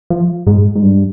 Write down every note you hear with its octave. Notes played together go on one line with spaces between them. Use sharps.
F3
G#2
G#2
G2